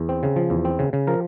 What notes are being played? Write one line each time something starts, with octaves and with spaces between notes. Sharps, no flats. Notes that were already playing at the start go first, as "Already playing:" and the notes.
Already playing: E2
C4
C#3
F3
E2
C4
C#3
C#3
F3 A#4